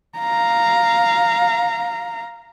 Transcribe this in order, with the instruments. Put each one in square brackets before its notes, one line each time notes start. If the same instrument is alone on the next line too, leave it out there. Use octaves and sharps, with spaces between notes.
[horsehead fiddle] F5 A#5